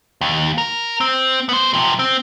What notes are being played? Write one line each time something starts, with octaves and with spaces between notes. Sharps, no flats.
D#2
A#4
C4
B3 C5
C3 F3
C4